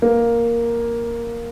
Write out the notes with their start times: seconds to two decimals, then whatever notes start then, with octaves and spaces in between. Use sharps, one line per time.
0.02 A#3